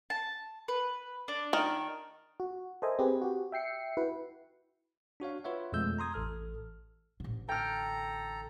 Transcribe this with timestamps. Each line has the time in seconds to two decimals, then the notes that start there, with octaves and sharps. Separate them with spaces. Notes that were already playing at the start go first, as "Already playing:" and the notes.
0.10 A5
0.68 B4
1.28 D4
1.53 D#3
2.40 F#4
2.82 A4 A#4 C5 D#5 E5 G#5
2.99 C4 G4 G#4 B4
3.22 F#4 G4
3.52 E5 G5 C7 C#7
3.97 E4 F#4 B4
5.20 D4 F#4 C#5 F5
5.44 F4 B4 C#5 E5 F#5
5.73 F2 B2 G#3 A3 E6 G6
5.98 A#5 C6 D#6 G#6
6.14 A1 A4 F6
7.20 A1 D3
7.49 A4 G5 A#5 F6